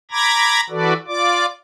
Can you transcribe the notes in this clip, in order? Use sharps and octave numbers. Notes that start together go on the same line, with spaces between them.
A#5 B5 D6 G#6 A#6
E3 F#4 A4 B4 D5
F4 D5 D6